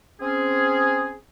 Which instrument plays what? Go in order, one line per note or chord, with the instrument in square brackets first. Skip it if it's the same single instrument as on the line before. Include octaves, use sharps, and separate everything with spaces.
[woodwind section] C4 C#4 G#4